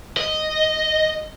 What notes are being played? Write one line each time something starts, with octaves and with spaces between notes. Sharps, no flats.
D#5